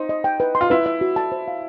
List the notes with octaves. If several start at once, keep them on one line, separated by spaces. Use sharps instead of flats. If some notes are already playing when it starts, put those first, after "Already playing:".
Already playing: D#4 C5
D#5
G5
B4
C6
F4
E4 B4
E5
F#4
A5
C5
F5